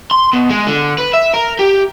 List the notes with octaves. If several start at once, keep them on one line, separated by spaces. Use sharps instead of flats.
C6
B2
G#3
D3
B4
E5
A#4
G4